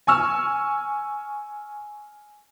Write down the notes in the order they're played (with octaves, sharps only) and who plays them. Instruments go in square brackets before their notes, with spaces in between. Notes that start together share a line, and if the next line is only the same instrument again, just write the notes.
[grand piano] G#5 C#6 E6 F6